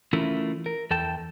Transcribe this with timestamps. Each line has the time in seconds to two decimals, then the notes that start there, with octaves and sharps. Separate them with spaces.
0.13 E3 A3 C#4 E4 F4 A#4
0.66 A#4
0.91 E2 A4 G5 A5